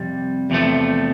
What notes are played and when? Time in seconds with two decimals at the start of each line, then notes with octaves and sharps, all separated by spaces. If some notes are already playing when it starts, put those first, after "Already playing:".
Already playing: F2 C3 G3
0.50 E2 C3 F3 A3